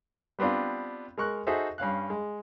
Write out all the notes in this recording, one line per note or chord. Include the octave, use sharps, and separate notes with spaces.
G3 B3 C4 D4 F4
G#3 A#4 C#6 F#6
D#4 F#4 G#4 A4 C5 E5
G2 C#4 F5 F#6
G#3